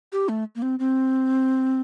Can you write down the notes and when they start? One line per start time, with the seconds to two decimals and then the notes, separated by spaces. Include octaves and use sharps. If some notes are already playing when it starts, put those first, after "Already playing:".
0.12 G4
0.29 A3
0.56 A#3
0.62 C4
0.79 C4